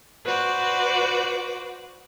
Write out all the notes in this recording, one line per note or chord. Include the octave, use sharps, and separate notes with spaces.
F#4 B4 C5 D5